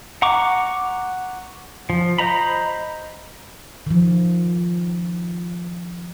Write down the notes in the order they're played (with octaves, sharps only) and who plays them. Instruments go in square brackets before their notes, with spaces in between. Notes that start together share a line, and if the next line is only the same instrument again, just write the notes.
[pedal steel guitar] F#5 A#5 C#6 D6
F3
C5 D#5 A#5 B5
[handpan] D#3 F3